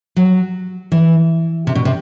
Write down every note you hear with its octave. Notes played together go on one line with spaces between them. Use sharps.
F#3
E3
C3
B2
C3